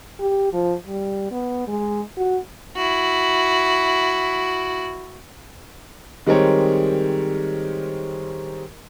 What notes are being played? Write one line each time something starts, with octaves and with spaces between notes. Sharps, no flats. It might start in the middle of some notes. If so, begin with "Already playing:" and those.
G4
F3
G3
B3
G#3
F#4
E4 F#4
D#3 G3 G#3 C4 A#4 C#5